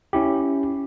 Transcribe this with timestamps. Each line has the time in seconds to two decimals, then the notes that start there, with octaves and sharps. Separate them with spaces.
0.13 C#4 E4 G4